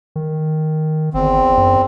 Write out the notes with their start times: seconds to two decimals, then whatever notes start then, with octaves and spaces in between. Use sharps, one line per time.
0.16 D#3
1.14 G1 E2 C4
1.57 F#2